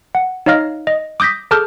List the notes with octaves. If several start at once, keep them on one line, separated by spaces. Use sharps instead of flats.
F#5
D#4 C#5 D#5 F5 F6 A#6
D#5
D6 D#6 G6 A#6 B6
G#4 A4 A5 D6 F6 G6